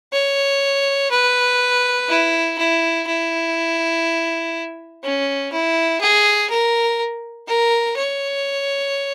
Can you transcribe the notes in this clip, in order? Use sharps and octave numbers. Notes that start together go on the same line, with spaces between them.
C#5
B4
E4
E4
E4
C#4
E4
G#4
A#4
A#4
C#5